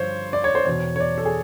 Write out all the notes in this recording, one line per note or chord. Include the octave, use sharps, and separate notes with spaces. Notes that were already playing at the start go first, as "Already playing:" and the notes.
Already playing: G2 D3 F3 C5 C#5
D5
C#5
C5
E2 B2 C#5
C#5
D5
A4
G#4